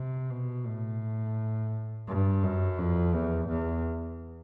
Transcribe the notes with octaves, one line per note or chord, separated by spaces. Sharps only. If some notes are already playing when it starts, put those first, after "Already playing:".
Already playing: C3
B2
A2
G2
F#2
F2
E2
E2